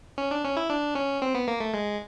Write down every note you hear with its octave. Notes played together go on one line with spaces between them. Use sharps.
C#4
D4
C#4
E4
D4
C#4
C4
B3
A#3
A3
G#3